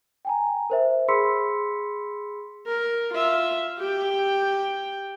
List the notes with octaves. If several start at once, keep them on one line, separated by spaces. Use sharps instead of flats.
G5 G#5 A#5
A#4 C5 E5
G#4 B5 C6 E6 B6 C#7
A#4
F4 E5
G4 G5